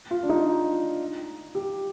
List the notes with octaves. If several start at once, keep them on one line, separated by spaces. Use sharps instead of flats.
F4
D4
D#4
G4